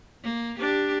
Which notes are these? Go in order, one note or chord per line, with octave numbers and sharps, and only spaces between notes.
A#3
D4 G4